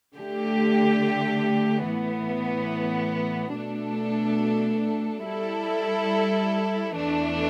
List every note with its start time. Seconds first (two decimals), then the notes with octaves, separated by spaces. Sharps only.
0.15 D3 A3 G4
1.85 A2 E3 B3
3.55 B2 A3 D4 A4
5.25 G3 E4 A4
6.95 E2 E3 A3 D4